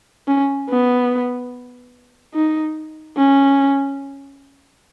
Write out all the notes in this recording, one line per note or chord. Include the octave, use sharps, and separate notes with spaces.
C#4
B3
D#4
C#4